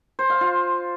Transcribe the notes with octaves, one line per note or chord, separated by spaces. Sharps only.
C5
F5
F4